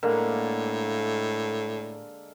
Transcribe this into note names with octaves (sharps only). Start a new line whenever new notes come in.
A2 D3 G#3 A#3 A#4